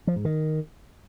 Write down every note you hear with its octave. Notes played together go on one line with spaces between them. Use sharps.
F3
G#2
D#3